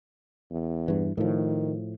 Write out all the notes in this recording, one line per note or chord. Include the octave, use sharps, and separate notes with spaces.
E2
G2 E3
A2 D#3 F3